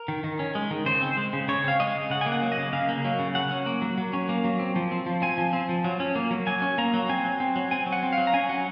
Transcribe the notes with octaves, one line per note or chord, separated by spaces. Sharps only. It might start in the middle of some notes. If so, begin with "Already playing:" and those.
Already playing: A#4
D#3
D#3
C#4
G#3
D#3
C#3 C5
C4
G#3
C#3
C#3 C#5
C4 F5
G#3 D#5
C#3
C#3 F#5
G#5
A#3
F#5
F#3
D#5
C#3
C#3 F5
A#3
F#3
C#3
F#3 F#5
C#4
A#3
F#3
F#3
C#4
A#3
F#3
C4
F3
C4
F3
C4 G#5
F3
C4
F3
F#3
C#4
A#3
F#3
F#3 G#5
C#4
A#3 A#5
F#3
C4 G#5
F#3
C4
F#3
C4 G#5
F#3
F#5
C4
F5
F#3
A#5
C#4 G#5
F#3 F#5